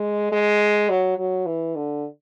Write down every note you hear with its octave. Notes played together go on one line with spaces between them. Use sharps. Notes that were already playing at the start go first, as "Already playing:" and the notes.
Already playing: G#3
G#3
F#3
F#3
E3
D3